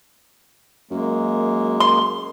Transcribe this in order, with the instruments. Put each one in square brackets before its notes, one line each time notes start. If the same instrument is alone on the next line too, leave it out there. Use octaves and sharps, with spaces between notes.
[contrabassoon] F#2 [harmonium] G#3 A#3
[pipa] C6